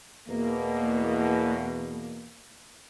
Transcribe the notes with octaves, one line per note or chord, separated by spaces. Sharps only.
E2 B2 A#3